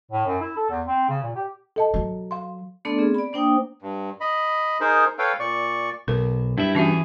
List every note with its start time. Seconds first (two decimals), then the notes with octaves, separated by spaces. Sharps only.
0.11 A2
0.26 F#2
0.41 E4
0.56 A4
0.70 E2
0.87 C4
1.09 C#3
1.23 A#2
1.36 G4
1.76 A4 D#5 A5
1.94 F#3
2.31 F5 C6
2.85 A3 B3 D4 A4 D5 C6
2.98 C4 G#4
3.14 D5 B5
3.33 A#3 D4 C5 G5 D#6
3.82 G2
4.21 D#5 B5
4.81 D#4 G#4 A#4 C5
5.19 A4 B4 C#5 F5 G5
5.39 A#2 D5 C#6
6.08 B1 A#4
6.58 G2 E4 E5
6.75 E3 C#4 F#4 G#4 E5